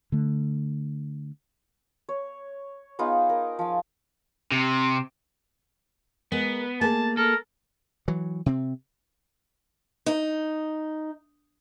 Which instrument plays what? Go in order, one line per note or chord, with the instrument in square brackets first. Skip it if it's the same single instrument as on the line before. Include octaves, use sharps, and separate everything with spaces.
[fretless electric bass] D3 A3
[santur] C#5
B3 D#4 F4 G#4
A#4
F3 F5
[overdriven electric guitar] C3
[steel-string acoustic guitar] G#3 A#4 [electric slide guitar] B3
[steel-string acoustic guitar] A3 A#3 G#4 [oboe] A5
[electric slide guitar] A4 [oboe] A#4
[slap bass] E3 F#3
C3 C4
[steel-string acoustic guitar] D#4